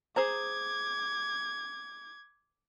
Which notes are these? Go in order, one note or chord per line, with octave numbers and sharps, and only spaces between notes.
G#4 C5 A#5 D6 G#6